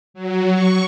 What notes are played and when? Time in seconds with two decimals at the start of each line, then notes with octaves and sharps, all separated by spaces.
0.14 F#3
0.52 C#6